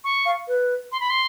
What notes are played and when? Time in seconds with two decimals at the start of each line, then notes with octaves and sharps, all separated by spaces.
0.04 C#6
0.26 F5
0.48 B4
0.92 C6
1.00 B5
1.10 C6